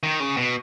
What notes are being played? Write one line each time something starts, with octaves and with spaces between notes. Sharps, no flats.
D#3
C#3
B2